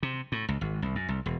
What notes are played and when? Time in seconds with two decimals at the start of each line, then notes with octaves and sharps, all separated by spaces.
0.03 C3
0.32 A2
0.49 C#2
0.61 G#1
0.82 C2
0.95 F#2
1.09 C2
1.26 E1